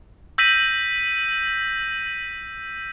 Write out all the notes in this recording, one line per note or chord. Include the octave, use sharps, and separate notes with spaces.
E6 G6 A#6 B6 D#7 F#7